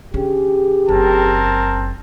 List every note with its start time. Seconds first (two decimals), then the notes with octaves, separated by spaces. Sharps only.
0.14 D3 C#4 G4 G#4
0.89 F#1 C4 A#4 A5